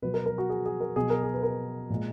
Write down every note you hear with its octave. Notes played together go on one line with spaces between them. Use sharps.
B2 F#3 B4
A#4
A#4
F#4
G#4
G#4
A#4
B2 F#3 G#4
A#4
G#4
B4
A#4
A#2 G#3